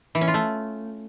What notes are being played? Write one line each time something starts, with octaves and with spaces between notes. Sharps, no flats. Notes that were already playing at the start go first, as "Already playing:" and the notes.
E3
C#4
F4
A3